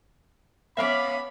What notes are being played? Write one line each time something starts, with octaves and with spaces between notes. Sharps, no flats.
B3 C#4 E5 F5 B5 D6